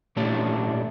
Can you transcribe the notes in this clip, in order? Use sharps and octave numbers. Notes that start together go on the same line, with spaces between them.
A#2 A3 C#4 D4 E4 G4